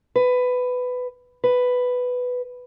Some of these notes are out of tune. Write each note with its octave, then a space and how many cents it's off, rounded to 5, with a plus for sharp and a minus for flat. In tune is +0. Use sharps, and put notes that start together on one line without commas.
B4 +15
B4 +5